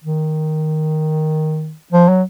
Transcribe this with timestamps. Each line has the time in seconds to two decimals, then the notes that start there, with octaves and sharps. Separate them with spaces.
0.04 D#3
1.92 F3
2.09 F#3